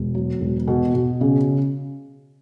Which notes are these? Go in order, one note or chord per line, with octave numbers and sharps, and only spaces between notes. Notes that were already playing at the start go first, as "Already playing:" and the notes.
Already playing: E1
F#3
E1
B2
B2
C#3